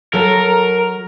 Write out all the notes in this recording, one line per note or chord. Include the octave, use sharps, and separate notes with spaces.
F#3 A4 A#4 C#5